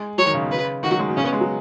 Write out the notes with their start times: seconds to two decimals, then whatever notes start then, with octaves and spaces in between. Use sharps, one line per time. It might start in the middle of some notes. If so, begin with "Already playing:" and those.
Already playing: G#3
0.18 F#3 C#5
0.26 D#3
0.34 C#3
0.42 B2
0.51 C#3 B4
0.83 D#3 F#4
0.91 F#3
0.99 G#3
1.08 B2
1.17 C#3 C#4
1.24 B3
1.33 G#3
1.41 F#3